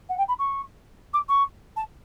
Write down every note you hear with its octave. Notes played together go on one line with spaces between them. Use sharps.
F#5
G5
B5
C#6
D6
C#6
A5